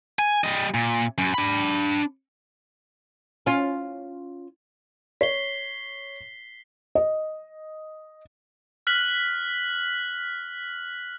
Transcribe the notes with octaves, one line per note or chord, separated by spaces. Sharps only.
G#5
G3 D#5
A#2
F#2
D4 B5
C#4 F4
C#5 B6 C7 G7
D#5
F6 F#6 B6 F#7